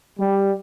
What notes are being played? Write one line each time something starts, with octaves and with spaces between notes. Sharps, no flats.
G3